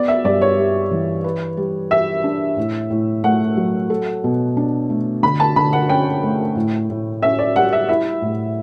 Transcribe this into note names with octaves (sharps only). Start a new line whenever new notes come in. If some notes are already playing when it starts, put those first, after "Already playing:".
Already playing: B3 D5
E5
G2 D5
C#5
G3
E3
B4
G3
G4 E5
D4
A2
A2
A3 F#5
F#3
A4
B2
D4
A3
D3 B5
A5
D3 B5
F#5
C#4 G5
A3
A2
A2
C#4 E5
D5
G3 F#5
E5
E4 E5
A2